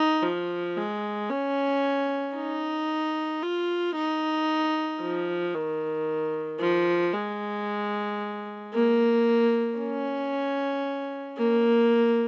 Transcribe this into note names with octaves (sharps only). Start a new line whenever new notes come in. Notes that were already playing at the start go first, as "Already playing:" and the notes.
Already playing: D#4
F3
G#3
C#4
D#4
F4
D#4
F3
D#3
F3
G#3
A#3
C#4
A#3